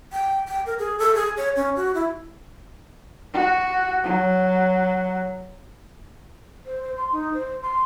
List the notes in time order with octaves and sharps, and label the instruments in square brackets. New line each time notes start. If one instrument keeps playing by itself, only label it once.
[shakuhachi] G5
G5
A#4
G#4
A4
G#4
C#5
C#4
F#4
E4
[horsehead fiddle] F#4
F#3
[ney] C5
C5
C6
D#4
C5
C6